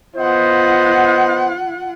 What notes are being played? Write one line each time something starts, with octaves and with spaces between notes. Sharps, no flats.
B3 F4 C5 D#5 F#5